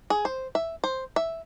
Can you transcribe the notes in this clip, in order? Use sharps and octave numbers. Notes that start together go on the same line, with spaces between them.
G#4
C5
E5
C5
E5